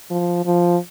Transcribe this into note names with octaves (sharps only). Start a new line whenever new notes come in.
F3
F3